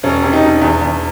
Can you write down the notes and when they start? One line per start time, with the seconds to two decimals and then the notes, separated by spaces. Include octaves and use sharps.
0.03 E1 C#4
0.23 C3
0.33 D#4
0.42 E1
0.61 E2
0.81 E2